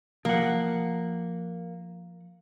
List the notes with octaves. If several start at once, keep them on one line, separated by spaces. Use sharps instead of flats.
F3 A#3 F#5